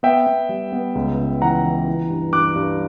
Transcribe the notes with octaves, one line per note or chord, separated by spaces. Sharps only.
B3 E5 G5
B3
G3
B3
C#2
C#2
E3 F#5 A#5
E3
E3
G2
G2 D6 F#6
G2